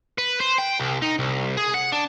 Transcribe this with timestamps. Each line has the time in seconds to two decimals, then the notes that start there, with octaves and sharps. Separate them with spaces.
0.18 B4
0.41 C5
0.59 G5
0.80 C2
1.02 D#4
1.19 C2
1.57 G#4
1.74 F#5
1.92 D4